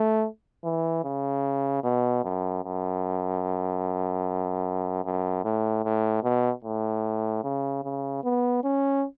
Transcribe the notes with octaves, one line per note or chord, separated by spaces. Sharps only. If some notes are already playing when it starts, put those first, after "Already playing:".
Already playing: A3
E3
C#3
B2
F#2
F#2
F#2
A2
A2
B2
A2
C#3
C#3
B3
C#4